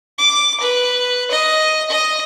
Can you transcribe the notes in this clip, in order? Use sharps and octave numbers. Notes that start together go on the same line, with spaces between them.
D6
B4
D#5
D#5